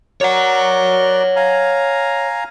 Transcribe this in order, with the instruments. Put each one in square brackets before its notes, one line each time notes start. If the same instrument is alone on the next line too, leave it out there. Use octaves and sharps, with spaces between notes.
[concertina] F#4 A#4 D5 [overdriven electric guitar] C#5 F#5
[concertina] F5 G#5 A#5